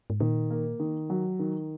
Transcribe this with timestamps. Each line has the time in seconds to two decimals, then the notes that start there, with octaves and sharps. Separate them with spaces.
0.10 G#2
0.20 A#2 D#3
0.50 A#3
0.79 D#3
1.10 F#3
1.39 D#3